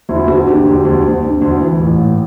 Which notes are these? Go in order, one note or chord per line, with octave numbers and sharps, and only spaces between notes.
D2 E4
D2 F#4
D3 G4
D2 G4
D2
D2
D3
D2
E3
A1
A2